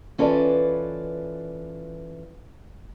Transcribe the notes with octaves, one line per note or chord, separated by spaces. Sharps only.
E3 C#4 F4 A4 B4 D5